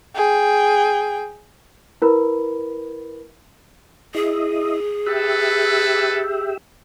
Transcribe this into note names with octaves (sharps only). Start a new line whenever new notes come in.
G#4 G5
E4 A#4 B4 B5
E4 G#4 D#5
E4 G4 A4 B4 E5